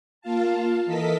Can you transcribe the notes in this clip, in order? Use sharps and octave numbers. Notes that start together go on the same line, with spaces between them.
A#3 F4 F5 A5
E3 A4 A#4 D#5 A5 B6